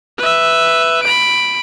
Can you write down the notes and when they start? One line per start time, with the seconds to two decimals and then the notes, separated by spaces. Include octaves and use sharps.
0.18 B4 E5
1.03 B5 D7